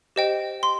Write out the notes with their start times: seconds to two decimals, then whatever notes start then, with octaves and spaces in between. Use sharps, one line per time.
0.16 G4 C5 D#5 G5
0.63 C6